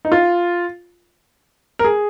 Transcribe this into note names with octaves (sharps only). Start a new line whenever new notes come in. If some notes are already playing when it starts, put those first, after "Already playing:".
D#4
F4
A#4
G#4